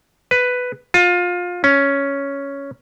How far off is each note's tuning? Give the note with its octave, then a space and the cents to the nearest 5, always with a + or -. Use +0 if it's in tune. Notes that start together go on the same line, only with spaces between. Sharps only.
B4 +5
F4 +25
C#4 +5